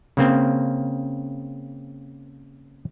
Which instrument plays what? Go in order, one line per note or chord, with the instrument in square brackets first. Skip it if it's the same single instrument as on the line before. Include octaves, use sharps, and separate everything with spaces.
[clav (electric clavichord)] C#3 A#3 C4